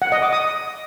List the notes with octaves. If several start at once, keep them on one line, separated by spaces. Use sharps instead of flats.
F#5
D#5
D6
D#6